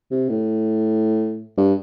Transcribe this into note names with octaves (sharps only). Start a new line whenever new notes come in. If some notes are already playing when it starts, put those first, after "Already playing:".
C3
A2
G2